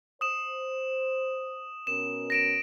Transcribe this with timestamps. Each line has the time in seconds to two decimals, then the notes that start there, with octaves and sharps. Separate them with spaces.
0.21 C5 D#6 E7
1.87 B2 C#4 A#4 E7
2.30 A#6 D7 E7